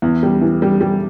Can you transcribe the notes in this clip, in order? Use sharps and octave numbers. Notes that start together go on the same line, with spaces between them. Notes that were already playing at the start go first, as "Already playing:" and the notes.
E2
G3
E3
G3
G3